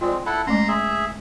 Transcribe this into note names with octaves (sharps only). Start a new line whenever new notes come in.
G#3 C4 F4 D5
E4 A4 F#5 B5
G#3 A3 C#4 A#5 C6
G#4 E5